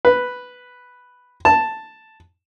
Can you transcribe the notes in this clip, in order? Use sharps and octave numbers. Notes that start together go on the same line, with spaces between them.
B4
A5